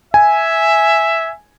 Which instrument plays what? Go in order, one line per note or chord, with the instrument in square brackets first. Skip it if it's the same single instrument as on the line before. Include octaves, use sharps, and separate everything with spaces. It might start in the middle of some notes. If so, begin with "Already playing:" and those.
[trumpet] E5 [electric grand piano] G#5